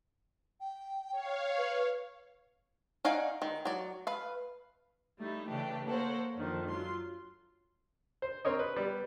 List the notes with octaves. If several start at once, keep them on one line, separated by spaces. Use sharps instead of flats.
G5
C#5 F5
B4
D#4 D5 F5 F#5 G#5
D#3
F#3 D5
B4 F5
G3 A3 D#4 E4
C#3 E3 A3 D4 G4
A#3 A4 C5 C#5 F#5
F#2 D3 D#3 F3
F#3 F4 C6
C5
C4 A#4 C#5 D#5
B4
G3 B3